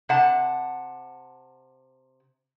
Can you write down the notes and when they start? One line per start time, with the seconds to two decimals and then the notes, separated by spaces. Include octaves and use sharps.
0.09 C3 F#5 A5